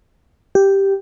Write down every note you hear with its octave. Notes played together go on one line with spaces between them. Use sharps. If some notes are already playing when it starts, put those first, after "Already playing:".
G4